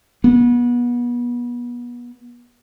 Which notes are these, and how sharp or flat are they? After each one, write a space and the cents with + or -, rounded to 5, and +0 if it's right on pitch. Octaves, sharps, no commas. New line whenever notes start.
B3 -30